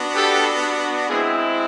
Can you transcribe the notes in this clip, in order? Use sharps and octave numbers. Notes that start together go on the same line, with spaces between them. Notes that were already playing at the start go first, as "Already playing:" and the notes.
Already playing: B3 D4 F#4
G4 A4
G#3 C4 E4 G#4